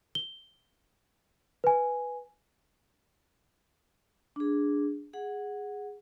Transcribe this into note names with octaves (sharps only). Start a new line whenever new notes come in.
G7
B4 G#5
D4 G#4
G#4 F#5